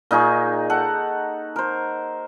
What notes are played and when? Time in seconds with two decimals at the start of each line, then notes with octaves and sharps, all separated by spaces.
0.11 A#2 D#4 G#4 C#6
0.70 A4 F#5
1.56 A#4 C5